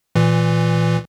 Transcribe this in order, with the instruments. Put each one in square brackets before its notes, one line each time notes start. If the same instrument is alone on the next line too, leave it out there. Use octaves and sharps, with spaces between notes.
[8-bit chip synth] A#2 E3